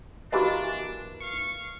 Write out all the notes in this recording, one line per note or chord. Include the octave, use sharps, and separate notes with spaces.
E3 A#3 D4 F#4 G4 B4 D#5
F5 C#6